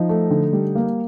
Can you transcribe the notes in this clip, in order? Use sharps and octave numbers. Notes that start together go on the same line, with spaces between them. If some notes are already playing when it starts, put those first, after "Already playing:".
Already playing: F3 D#4
A3
D3
G3
A#3